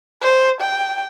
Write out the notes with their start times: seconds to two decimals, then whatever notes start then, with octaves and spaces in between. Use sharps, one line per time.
0.22 C5
0.61 G5